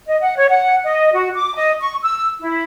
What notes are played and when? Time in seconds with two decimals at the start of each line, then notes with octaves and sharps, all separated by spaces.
0.07 D#5
0.21 F#5
0.37 C#5
0.49 F#5
0.85 D#5
1.13 F#4
1.34 D6
1.55 D#5
1.81 C#6
2.03 E6
2.41 E4